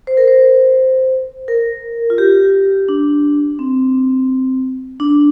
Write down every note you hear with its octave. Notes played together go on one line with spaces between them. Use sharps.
C5
A#4
C5
A#4
F4
G4
D4
C4
D4